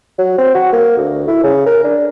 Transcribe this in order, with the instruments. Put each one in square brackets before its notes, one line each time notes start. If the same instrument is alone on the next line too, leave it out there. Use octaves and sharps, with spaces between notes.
[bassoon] F#3
C4
F#4
A#3
D2
E4
C#3
A#4
D4